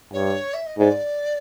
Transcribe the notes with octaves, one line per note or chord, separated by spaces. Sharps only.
G2 C#5
E5
D#5
G#2 D5